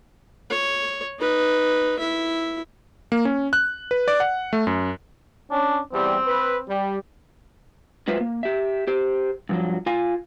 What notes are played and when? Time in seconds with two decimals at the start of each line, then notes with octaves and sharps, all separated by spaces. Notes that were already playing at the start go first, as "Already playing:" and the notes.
0.50 C#5
1.19 D#4 B4
1.98 E4 E5
3.12 A#3
3.25 C#4
3.53 F#6
3.91 B4
4.08 D5
4.20 F#5
4.53 A3
4.67 F#2
5.51 C#4 D4
5.93 E2 G3 C4
6.26 B4
6.68 G3
8.08 F#3 G#3 F4 B4 C5 E5
8.21 A#3
8.43 G4 E5
8.87 G4 C5
9.49 G2 F3 F#3
9.86 F4 F5 G#5